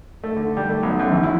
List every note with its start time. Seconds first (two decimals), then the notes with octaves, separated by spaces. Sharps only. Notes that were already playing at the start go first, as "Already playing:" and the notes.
0.24 A3
0.36 D3
0.57 G3
0.69 A3
0.83 B1
0.99 F#2
1.12 A1
1.23 E4